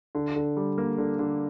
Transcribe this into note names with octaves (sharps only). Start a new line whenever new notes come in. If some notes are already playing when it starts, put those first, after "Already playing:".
D3
D3
G3
A#3
D3
D3